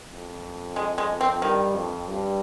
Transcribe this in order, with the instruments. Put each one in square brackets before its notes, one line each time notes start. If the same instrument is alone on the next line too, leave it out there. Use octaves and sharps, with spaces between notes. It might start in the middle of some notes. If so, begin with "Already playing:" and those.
[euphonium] F2
[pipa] G#3
G#3
C4
[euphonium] G2 [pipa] D#3
[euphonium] F2
G2